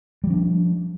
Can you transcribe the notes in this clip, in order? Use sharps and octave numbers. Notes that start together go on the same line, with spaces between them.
F3 G3 C#4 D4